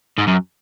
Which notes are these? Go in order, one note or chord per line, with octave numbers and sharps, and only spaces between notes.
G#2
F#2